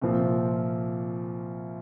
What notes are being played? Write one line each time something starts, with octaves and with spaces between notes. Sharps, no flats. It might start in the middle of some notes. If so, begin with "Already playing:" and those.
C2 A#2 F3 C4